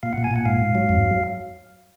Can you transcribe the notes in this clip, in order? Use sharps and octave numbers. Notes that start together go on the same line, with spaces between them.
A#2 F5
F#5
A#2
G#5
A#2 F#5
G#2 F5
G#2
F#3
F2